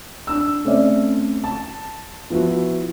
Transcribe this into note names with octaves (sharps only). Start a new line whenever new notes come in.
D4 E6
A3 C4 C#4 D5 E5
A5
F3 B3 E4 F#4